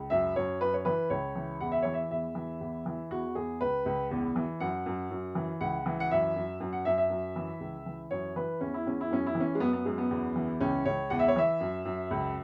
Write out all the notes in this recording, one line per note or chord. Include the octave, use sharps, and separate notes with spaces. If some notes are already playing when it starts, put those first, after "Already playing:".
Already playing: C#2
F#2 E5
F#2 C#5
F#2 B4
C#5
E3 B4
C#2 C#5
E3
E2 F#5
E5
E3 C#5
E5
E2 E5
E3
E2
E3
E2 F#4
E2 G#4
C#2 B4
C#2
E2
E3
F#2 F#5
F#2
F#2
E3
C#2 F#5
E3
F#5
F#2 E5
F#2
F#2
F#5
F#2 E5
E5
F#2
E3
C#2
E3
F#2 C#5
E3 B4
E2 C#4
E4
E2 C#4
E4
F#2 C#4
E4
E3
C#4
G#3
F#2 B3
B3
F#2 G#3
B3
E2
E3
C#2 C#4
C#2 C#5
E2 F#5
E5
C#5
E3 E5
F#2
F#2
C#2